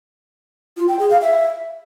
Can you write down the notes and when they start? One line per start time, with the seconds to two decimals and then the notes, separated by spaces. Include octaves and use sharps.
0.77 F4
0.88 G5
0.99 G#4
1.10 F5
1.21 E5